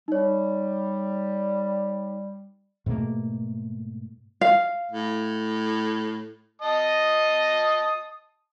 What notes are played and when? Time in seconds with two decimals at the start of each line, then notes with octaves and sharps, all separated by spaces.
0.08 G3 D#4 C#5
2.86 G#2 B2 A3 A#3
4.41 F5
4.91 A2
6.62 D#5 A5 D#6